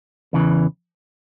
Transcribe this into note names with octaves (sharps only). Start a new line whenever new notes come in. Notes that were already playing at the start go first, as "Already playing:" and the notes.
E2 C#3 E3